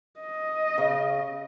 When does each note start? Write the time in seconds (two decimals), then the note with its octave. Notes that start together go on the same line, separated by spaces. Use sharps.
0.20 D#5
0.78 C#3